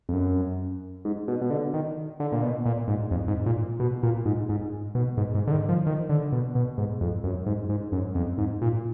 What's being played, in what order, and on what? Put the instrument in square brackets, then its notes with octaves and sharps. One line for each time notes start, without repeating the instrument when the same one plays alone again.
[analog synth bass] F2
F#2
G#2
B2
B2
D3
D#3
D3
A#2
B2
A#2
G#2
F2
G#2
A#2
B2
A#2
G#2
G#2
B2
G#2
G#2
D3
D#3
F3
D#3
D3
B2
B2
G#2
F2
F#2
G#2
G#2
F#2
F2
G#2
A#2